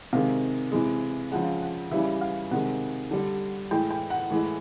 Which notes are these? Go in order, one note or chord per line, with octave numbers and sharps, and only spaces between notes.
C3 D#3 G#3 F5
C3 E3 G#3
C#3 F3 G#3 F#5
F#5
C#3 E3 G3 E5
F5
C3 D#3 G#3 F#5
D3 G3
A2 E3 G#3 G5
G5
F#5
A2 E3 G#3